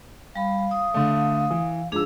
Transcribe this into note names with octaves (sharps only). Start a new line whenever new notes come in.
G3 F5 B5
D#6
D3 A3
E3
G#2 F3 D4 G#4 E6